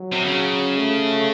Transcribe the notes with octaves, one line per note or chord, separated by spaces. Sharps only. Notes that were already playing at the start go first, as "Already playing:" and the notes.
Already playing: F#3
C3
C#3
A3